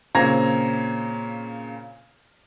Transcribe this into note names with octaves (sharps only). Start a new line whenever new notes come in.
A#2 C#3 C4 A#5 G#6 A#6